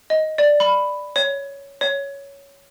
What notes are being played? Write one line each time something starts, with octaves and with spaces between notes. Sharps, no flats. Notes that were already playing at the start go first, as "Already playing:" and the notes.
D#5
D5
B5
C#5
C#5